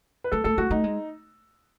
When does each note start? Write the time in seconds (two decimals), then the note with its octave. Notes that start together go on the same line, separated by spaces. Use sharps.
0.24 B4
0.32 A3 A4
0.44 A3 A4
0.58 A3 F#4
0.71 A3 D#4
0.84 G#3